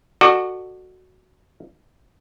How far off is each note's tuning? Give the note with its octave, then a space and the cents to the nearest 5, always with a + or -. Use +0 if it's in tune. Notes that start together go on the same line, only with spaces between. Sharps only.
F#4 +0 A4 +15 D5 +40